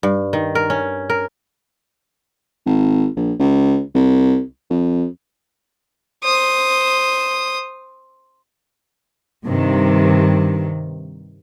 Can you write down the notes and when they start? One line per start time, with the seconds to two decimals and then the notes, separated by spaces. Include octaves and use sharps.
0.03 G2
0.33 D#3
0.55 A#4
0.70 C#4
1.10 A#4
2.66 G#1
3.16 A#1
3.39 C#2
3.94 C2
4.70 F2
6.24 C5 D#6
9.46 G2 C3 D#3